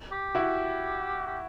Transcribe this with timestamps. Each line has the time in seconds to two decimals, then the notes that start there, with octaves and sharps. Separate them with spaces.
0.12 G4
0.35 E4 F#4
1.27 G4